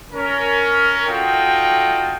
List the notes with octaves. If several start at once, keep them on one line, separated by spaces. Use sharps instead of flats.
C#4 A#4
D#4 F4 F#4 A4 D#5 G5